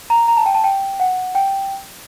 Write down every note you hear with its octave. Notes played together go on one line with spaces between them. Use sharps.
A#5
A#5
A5
G5
A5
G5
F#5
G5